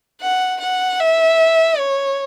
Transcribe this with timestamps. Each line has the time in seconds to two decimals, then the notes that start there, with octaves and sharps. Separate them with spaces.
0.21 F#5
0.61 F#5
1.00 E5
1.79 C#5